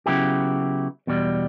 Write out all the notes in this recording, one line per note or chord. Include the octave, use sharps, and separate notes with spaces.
C#3 F#3 B3 E4 G4
E2 B2 G3